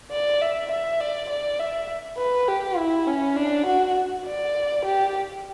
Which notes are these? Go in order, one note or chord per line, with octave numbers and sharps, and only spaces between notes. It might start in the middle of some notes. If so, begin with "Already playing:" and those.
D5
E5
E5
D5
D5
E5
B4
G4
E4
C#4
D4
F#4
D5
G4